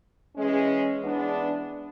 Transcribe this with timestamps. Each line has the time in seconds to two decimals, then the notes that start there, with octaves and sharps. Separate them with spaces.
0.36 E3 G#3 C#4
1.01 E3 G#3 B3 D4